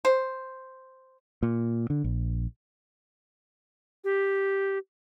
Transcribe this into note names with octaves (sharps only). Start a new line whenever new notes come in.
C5
A#2
D3
A#1
G4